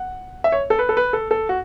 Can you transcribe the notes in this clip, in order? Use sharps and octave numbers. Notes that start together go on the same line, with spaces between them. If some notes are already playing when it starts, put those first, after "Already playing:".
Already playing: F#5
E5
C#5
A4
B4
A4
B4
A4
A4
F#4